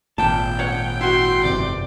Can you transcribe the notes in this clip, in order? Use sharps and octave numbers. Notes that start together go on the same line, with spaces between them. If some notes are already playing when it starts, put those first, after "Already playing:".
G#1 A#2 G5 A5
C#5 F#5
E4 F#4 C6
G1 F2 C3 D5